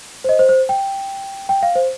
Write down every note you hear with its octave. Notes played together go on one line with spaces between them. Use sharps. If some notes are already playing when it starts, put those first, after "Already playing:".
C5
D#5
C5
C5
G5
G5
F5
C5